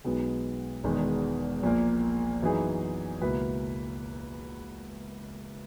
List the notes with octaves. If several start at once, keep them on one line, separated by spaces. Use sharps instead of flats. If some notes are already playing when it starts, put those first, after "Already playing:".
B1 B2 G#3 B3 D#4
E1 E2 D#3 G#3 B3
A#1 A#2 A#3
F#2 E3 B3 D#4 G#4
C#2 B2 A#3 E4 B4